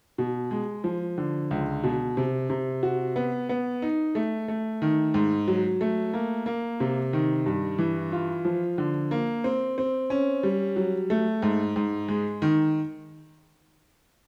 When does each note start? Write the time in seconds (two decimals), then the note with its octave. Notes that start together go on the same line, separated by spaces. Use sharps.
0.18 B2
0.51 G#3
0.84 F3
1.18 D3
1.51 C#2
1.84 B2
2.17 C3
2.50 C3
2.83 F#4
3.16 B3
3.49 B3
3.82 D#4
4.15 A3
4.48 A3
4.82 D#3
5.14 G#2
5.48 F#3
5.81 A3
6.13 A#3
6.46 A#3
6.80 C3
7.13 D#3
7.46 G2
7.79 E3
8.12 F4
8.45 F3
8.78 D3
9.11 A#3
9.44 C4
9.78 C4
10.10 C#4
10.43 G3
10.76 F#3
11.10 A3
11.42 G#2
11.76 G#2
12.08 G#3
12.42 D#3